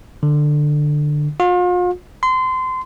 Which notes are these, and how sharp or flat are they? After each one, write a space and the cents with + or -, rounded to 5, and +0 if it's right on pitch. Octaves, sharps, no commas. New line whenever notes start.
D3 +15
F4 +40
C6 -25